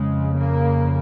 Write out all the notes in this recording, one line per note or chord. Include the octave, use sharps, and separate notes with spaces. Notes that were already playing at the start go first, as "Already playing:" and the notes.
Already playing: F2 C#3 G#3
A#3